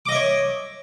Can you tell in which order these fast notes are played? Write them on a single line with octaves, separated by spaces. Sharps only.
D6 D#5 E5 C#5